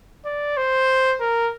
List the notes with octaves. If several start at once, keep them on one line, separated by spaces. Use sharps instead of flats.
D5
C5
A#4